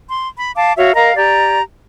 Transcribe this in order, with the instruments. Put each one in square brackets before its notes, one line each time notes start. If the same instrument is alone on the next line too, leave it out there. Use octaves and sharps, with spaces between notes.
[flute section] C6
B5
F5 A5 D6
F#4 C#5 E5 F5
A#4 D#5 F5 A#5
G4 D5 A#5